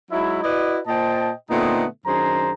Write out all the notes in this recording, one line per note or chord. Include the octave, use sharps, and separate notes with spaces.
F#3 G#3 D#4 E4
E4 F#4 B4 D5 D#5
A#2 C5 D#5 G5 A5
A#2 D3 A3 B3 C4 D#4
F#2 D#3 D4 G#4 C5 A#5